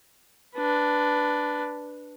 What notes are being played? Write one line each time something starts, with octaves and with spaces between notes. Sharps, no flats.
D4 B4